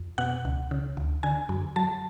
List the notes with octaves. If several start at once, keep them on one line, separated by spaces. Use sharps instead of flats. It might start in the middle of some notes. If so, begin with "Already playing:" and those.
Already playing: F2
B2 F#5
C#2
C#3
D2
D3 G#5
F#2
F#3 A5